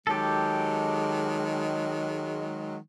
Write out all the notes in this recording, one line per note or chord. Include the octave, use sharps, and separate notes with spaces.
D#3 F#3 G#3 G4 A4